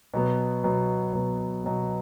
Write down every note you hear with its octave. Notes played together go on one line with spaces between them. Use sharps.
B2 F#3 B3
B2 F#3 B3
B2 F#3 B3
B2 F#3 B3